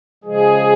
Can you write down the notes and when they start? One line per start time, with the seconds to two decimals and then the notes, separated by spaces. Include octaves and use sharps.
0.24 C#3 F3 G#3 G#4